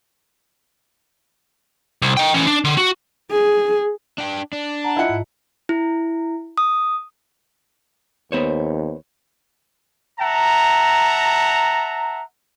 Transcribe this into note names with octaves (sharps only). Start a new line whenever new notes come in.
C2
D#5 G5
E3 C#4
D4
D3
F#4
G#4
D4 G5
D4
F#5 A5 A#5
E4 F4 D#5 F#5
G#2
E4
D#6
D#2 B3 C5 C#5
E5 F#5 A5 A#5